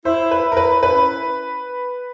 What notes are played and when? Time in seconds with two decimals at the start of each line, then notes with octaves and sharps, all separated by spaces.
0.05 E4 C5
0.31 B4
0.43 E4
0.52 A#4
0.57 B4
0.82 C#4 B4